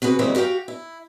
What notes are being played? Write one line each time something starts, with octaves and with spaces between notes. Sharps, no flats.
C3 F#4 G#4 B4
G#2 C#3 E3 G3 A#3 C4
F#4 G4 A#4 F5 G5
E4